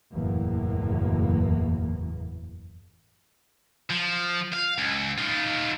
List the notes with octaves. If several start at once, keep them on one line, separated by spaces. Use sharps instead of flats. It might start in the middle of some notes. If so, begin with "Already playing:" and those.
F#1 E2 A2 A#3
F3
F5
C#2
D#4 F4